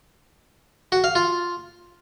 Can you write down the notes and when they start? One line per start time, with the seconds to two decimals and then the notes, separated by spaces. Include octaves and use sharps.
0.92 F#4
1.04 F5
1.15 F4